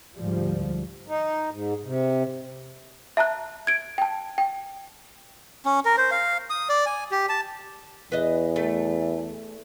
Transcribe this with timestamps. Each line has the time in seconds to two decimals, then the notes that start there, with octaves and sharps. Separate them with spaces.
0.17 D2 G#2 F3 G3
1.08 D#4
1.51 G#2
1.85 C3
3.17 E5 A5 A#5 F#6
3.67 G#6 D7
3.98 G5 A5
4.38 G5
5.65 C#4
5.85 A#4
5.98 C5
6.11 F5
6.50 D#6
6.69 D5
6.86 G#5
7.11 G4
7.29 A5
8.12 E2 B4 D#5
8.56 A3